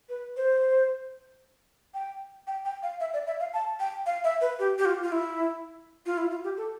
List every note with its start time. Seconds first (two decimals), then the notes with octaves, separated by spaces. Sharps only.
0.09 B4
0.37 C5
1.94 G5
2.47 G5
2.65 G5
2.83 F5
3.00 E5
3.14 D5
3.27 E5
3.40 F5
3.54 A5
3.80 G5
4.06 F5
4.24 E5
4.41 B4
4.59 G4
4.78 G4
4.85 F4
5.03 F4
5.12 E4
6.06 F4
6.18 E4
6.31 F4
6.44 G4
6.57 A4